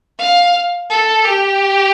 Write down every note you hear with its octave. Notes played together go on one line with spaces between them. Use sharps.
F5
A4
G4